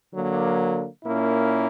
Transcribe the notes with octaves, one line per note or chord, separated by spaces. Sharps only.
D3 F#3 A#3
A#2 A#3 C#4 E4